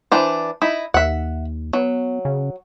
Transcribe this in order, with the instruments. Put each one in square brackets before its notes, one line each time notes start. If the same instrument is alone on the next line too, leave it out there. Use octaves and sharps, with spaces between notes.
[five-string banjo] E3 D4 C5
D#4 E4
[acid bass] D#2 [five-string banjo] E5 F#5
[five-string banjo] F#3 [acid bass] B3
[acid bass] C#3